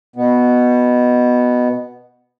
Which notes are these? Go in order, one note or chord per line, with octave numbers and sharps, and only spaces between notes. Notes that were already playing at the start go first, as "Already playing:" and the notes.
B2 B3